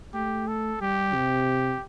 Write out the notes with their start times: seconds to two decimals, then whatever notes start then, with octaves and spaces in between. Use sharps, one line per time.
0.14 A3 G4
0.48 A4
0.81 G3 G4
1.14 C3